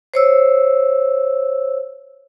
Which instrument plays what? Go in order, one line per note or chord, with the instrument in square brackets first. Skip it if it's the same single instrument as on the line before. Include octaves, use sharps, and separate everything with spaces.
[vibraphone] C5 C#5 E6